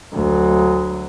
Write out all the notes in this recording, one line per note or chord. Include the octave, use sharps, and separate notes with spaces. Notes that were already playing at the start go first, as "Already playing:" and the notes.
D2 F#3